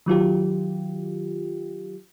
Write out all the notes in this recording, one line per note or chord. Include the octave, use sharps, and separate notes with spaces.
D#3 F#3 F4 G4